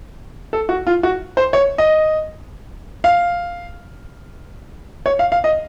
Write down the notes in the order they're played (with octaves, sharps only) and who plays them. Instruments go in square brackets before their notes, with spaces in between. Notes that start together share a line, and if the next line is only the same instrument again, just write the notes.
[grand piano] A4
F#4
F4
F#4
C5
C#5
D#5
F5
C#5
F5
F5
D#5